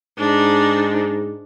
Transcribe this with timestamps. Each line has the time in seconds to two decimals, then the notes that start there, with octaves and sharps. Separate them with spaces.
0.18 G#2 D4 D#4